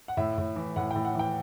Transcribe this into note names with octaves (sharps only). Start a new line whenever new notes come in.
F#5
A2 E5
A2
E3
A2 F#5
A2 G5
F#5
E3 G5